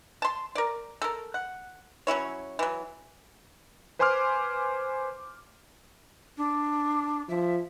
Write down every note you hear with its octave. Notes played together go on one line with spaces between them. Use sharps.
A5 C6
A#4 D5
A4 A#4
F#5
F#3 C#4 E4 C#5
E3 F#3
B4 C5 G#5 C6 D6 F6
D4
F3 E5